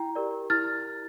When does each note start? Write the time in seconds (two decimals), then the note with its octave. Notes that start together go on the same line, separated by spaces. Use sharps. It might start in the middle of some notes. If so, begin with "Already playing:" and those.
Already playing: E4 G5 A#5
0.15 G4 A#4 D5
0.50 E4 F6 A6